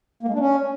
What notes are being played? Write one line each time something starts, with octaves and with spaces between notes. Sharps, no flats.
A#3
G#3
D4
C#4